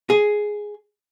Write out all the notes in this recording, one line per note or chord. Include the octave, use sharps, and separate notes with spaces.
G#4